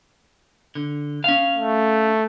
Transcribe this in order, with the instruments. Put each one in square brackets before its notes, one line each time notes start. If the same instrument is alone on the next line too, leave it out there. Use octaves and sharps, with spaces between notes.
[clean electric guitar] D3
C#4 F5
[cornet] A3